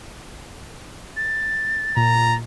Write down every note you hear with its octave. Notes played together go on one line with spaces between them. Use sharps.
A6
A#2 A#5